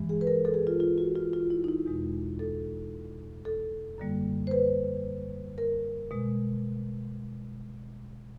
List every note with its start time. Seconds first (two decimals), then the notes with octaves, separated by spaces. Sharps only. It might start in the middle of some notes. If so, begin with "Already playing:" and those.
Already playing: G2 E3 G#3
0.09 G#4
0.21 B4
0.27 A#4
0.45 A4
0.54 G#4
0.67 F4
0.80 F4
0.98 F#4
1.15 F4
1.33 F4
1.50 E4
1.64 D#4
1.68 E4
1.86 E2 B2 G#3
2.39 A4
3.45 A4
3.98 F#2 D3 G3 A#3
4.47 C5
4.51 B4
5.58 A#4
6.11 B2 G#3